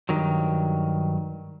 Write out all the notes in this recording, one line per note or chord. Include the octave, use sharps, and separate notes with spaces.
G2 A#2 D#3 F#3